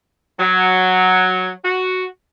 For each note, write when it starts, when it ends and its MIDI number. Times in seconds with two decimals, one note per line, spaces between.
0.39 1.50 54
1.64 2.05 66